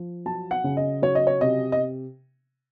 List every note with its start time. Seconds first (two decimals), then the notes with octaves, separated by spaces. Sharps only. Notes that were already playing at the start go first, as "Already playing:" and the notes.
Already playing: F3
0.26 F#3 A5
0.51 F#5
0.64 C#3
0.77 D#5
1.02 F#3 C#5
1.15 D#5
1.27 C#5
1.41 C3 D#5
1.72 D#5